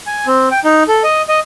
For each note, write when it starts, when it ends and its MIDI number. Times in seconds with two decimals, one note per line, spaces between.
0.07 0.26 80
0.27 0.49 60
0.51 0.60 79
0.64 0.83 63
0.88 1.03 69
1.04 1.22 75
1.29 1.40 75